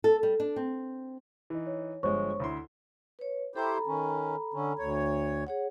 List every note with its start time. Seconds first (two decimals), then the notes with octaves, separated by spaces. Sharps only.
0.04 A4
0.23 G3
0.40 D4
0.56 C4
1.50 E3 D#4
1.67 C#5
2.03 G1 F3 G#3 C5 C#5 C#6
2.40 D2 E4 C6
3.19 B4 C#5
3.56 E4 G4 A4 C5 A#5 B5
3.87 D#3 C#4
4.54 D3 C#4
4.79 D2 C#5
5.47 G#4 C#5 F#5